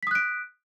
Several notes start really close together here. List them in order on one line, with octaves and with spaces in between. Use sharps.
B6 D#6 F#6 D7